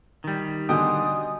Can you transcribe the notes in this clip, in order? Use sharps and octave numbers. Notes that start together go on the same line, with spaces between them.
D#3 G3
B2 D3 D#5 G5 G#5 C6 D#6